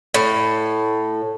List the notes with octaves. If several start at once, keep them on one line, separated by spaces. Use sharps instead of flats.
A2